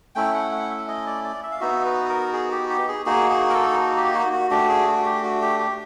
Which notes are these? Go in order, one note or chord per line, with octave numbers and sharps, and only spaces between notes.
A3 C#4 E4 G5
F#5
F#5
E5
D#5
D5
D5
E5
F5
B3 D#4 F#4 E5
B4
A#4
G#4
G4
G4
G#4
A#3 D#4 F#4 G#4
G#4
A#4
A4
G4
F#4
F#4
A3 D4 F#4 G4
G#4
F#4
G4
F#4
G4
G4